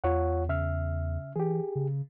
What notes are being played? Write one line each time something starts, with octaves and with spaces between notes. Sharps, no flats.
E2 F4 C#5 F#5
C#3 E5 F6
E3 G4 G#4
C#3